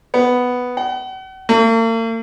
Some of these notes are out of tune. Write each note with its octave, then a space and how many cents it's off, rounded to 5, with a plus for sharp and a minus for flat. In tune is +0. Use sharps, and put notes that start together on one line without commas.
B3 +5
F#5 +40
A#3 -45